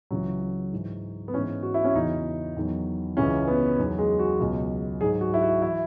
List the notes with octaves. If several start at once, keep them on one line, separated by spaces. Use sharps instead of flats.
C#2 C#3 E3 F#3
G#2 E3
B3
G#2 E3 C#4
F#4
E4
C#4
E2 C#3 E3 D#4
E2 D#3 F#3
C#2 C#3 E3 C#4
B3
E2 D#3 F#3
G#3
F#4
C#2 B2 F#3
G#2 D#3 F#3 G#4
F#4
E4
F#4
E3 E4